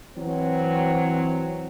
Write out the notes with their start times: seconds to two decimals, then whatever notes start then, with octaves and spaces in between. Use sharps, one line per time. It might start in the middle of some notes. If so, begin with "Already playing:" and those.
0.17 E3 F#3 C4